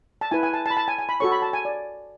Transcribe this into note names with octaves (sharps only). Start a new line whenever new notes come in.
A5
E4 B4 G#5
G#5
A5
A5
B5
A5
G#5
G#5
B5
F#4 A4 C#5 C#6
B5
A5
G#5
D5